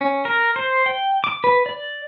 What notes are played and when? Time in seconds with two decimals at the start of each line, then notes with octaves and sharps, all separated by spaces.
0.01 C#4
0.25 A#4
0.56 C5
0.86 G5
1.24 D6
1.44 B4
1.66 D5